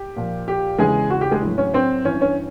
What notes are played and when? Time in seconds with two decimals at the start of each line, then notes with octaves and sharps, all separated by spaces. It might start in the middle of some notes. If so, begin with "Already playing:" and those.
Already playing: G4
0.16 A#2 F3
0.48 G4
0.78 E2 C#3 E3 G#3 G#4
1.10 F#4
1.21 G4
1.31 G#3 G#4
1.42 A2 F#3
1.58 C#4 C#5
1.74 C4 C5
2.05 G2 E3 C#4 C#5
2.21 C#4 C#5